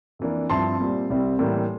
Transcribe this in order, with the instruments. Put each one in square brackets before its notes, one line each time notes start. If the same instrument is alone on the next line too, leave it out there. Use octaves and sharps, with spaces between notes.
[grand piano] F2 E3 A#3 D4
G2 F3 C4 E4 A5 C6
A#2 G3 C4
C2 C3 G3 C4 E4
A2 E3 G3 A#3